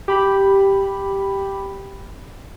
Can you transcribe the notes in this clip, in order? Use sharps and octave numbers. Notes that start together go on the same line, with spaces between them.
G4 B5